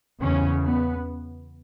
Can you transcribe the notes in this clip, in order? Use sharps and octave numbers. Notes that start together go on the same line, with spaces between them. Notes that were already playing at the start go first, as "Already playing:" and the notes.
E2 C#3 C#4
B3